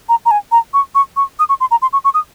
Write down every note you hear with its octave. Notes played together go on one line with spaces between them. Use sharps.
A#5
A#5
G#5
A#5
C#6
C#6
C#6
D#6
C#6
C6
A#5
C6
C#6
C#6
D#6